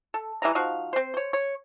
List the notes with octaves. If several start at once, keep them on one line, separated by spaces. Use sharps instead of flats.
A4
E3 G3 G#3 A#5
F3 D#4 F#4 F5
C4 C5
C5 C#5
C#5